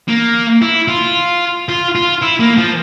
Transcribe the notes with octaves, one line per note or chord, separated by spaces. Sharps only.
A#3
E4
F4
F4
F4
E4
A#3
F3